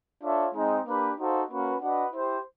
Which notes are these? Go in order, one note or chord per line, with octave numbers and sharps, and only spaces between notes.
D4 F4 A4 C#5 E5
G#3 C4 D#4
A#3 D4 G4 B4
D#4 F#4 A4 C5 F5
A#3 C#4 F#4 B4
D4 F#4 B4 D#5 F#5
E4 G4 C5